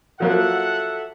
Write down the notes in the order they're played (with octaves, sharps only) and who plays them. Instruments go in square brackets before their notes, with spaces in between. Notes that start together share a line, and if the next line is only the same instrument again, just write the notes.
[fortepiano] F3 F#3 A#3 [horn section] A4 E5 F#5